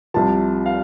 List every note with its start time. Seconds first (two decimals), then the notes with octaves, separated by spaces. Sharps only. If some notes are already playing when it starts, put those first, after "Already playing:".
0.14 C2 C3 F3 A5
0.66 F5